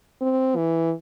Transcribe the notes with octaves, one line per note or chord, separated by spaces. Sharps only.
C4
E3